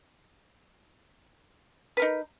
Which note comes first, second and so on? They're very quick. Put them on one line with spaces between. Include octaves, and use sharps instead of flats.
B4 A#4 D#4